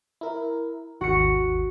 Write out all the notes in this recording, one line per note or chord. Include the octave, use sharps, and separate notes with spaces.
E4 A#4
G#1 D#2 F#4 C#7